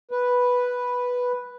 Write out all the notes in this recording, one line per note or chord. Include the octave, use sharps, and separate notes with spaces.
B4